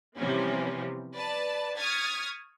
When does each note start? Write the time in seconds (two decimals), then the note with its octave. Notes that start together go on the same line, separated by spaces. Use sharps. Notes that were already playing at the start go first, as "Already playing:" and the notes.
0.17 C3 E3 F3 G3 B3 C#4
1.15 B4 D5 A5
1.75 C#6 D#6 F6 G#6 A6 B6